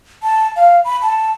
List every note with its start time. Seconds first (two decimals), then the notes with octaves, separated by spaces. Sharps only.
0.23 A5
0.56 F5
0.85 B5
1.02 A5